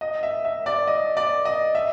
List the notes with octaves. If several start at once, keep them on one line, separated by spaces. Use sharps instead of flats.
D#5
E5
E5
D5
D#5
D5
D#5
E5